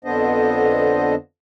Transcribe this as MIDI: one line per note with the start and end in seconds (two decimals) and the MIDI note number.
0.05 1.15 41
0.05 1.15 50
0.05 1.15 59
0.05 1.15 62
0.05 1.15 72
0.05 1.15 75